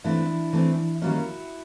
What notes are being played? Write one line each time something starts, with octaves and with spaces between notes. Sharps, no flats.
E3 A3 C4 D4 E4
E3 A3 C4
D#3 G3 A#3 C#4 E4 F#4